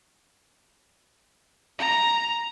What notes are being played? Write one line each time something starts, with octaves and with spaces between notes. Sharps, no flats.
A#5